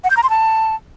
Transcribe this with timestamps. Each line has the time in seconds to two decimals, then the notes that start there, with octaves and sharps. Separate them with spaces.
0.04 F#5
0.10 G6
0.17 A#5
0.23 C6
0.30 A5